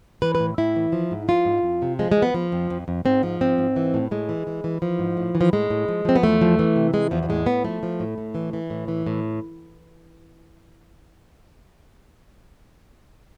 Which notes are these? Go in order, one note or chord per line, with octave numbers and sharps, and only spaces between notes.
E3 B4
B4
A2
A2 E4
E3
F3
G#2
F3 F4
G#2
F2
C3
F3 G#3
G#3
F3
B3
F3
F2
F2
F2
G#2 C4
F3
G#2 C4
G#2
E3
A2
A2 G#3
E3
E3
E3
E3 F3
G#2
A2
E3
F3
A2 G#3
A2
F3
F3 C4
B3
E2 A3
F3
E3
C3
E3 G#3
E2 F3
F3
A2 G#3
A2 B3
F3 A3
F3
A2
A2
E3
E3
A2
E3
A2